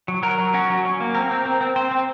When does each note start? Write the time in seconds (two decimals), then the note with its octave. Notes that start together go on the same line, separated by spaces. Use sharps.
0.08 F#3
0.23 F#3 A#4
0.38 F#3
0.54 C#4 F#4
0.70 F#3
0.85 C#4
1.00 A#3
1.15 C4 A#4
1.31 C4
1.45 C4
1.61 C4
1.76 C4 C5
1.91 C4